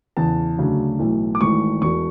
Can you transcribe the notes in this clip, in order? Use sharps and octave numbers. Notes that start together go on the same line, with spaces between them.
E2 C#3 E3 A5
D2 C#3 F#3 A3 D4
B1 A2 E3 A3
D6
G#1 G#2 E3 A3 C#6
E1 E2 B2 C#6